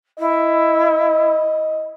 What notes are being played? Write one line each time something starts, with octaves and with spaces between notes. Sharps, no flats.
E4 D#5